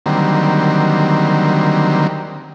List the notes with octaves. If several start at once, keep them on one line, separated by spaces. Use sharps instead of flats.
D3 D#3 F#3 G3 A#3 C4